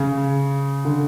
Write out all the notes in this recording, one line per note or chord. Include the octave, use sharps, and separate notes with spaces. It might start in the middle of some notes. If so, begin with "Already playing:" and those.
Already playing: C#3
D3